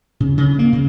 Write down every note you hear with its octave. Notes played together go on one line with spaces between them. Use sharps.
C#3
C#3
A#3
C#3